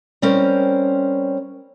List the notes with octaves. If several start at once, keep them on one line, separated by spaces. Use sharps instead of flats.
G3 C4 C#4 A#4 C5